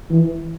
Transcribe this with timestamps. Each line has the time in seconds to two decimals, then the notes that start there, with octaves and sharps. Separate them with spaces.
0.10 E3